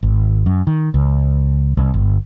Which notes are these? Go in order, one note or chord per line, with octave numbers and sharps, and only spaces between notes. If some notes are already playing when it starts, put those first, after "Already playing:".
G#1
F#2
D#3
C#2
C2
G1